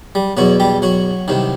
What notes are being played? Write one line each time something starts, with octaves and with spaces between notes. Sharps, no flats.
G3
E2 B2 F#3 F#4
G3 G4
F#3 F#4
C2 C3 D#3